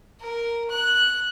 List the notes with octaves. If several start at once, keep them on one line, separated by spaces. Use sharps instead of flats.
A#4
F#6